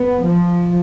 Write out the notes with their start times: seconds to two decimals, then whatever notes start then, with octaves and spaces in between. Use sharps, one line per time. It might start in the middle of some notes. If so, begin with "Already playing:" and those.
Already playing: B3
0.23 F3